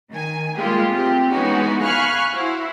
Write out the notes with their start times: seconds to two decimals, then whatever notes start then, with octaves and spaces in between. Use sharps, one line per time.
0.11 D#3 G#5
0.56 G3 G#3 A#3 F4 G4 G#4
0.90 A2 C3 C4 G4
1.31 E3 G#3 B3 C#4 D#4 F#4
1.81 F5 G#5 B5 C#6 F6 F#6
2.33 E4 F#4 C5